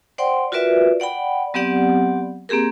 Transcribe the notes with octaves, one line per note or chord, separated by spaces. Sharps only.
C5 D5 F#5 G5 C6
F4 F#4 A#4 B4 D5 E5
D5 F#5 G5 B5
F#3 B3 C4 G4 D5 F#5
A#3 C4 G4 G#4 A#4